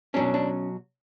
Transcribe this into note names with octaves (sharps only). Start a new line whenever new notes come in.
B2 F#3 C#4 D4
D4